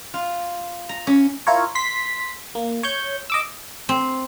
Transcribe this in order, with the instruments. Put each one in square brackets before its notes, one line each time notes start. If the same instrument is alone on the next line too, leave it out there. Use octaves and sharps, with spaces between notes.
[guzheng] F4
A#5
C#4
[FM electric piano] E4 F4 A#4 C#5
C6 B6
A#3
C#5 C#6 G6
D#5 D6 E6
[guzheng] C4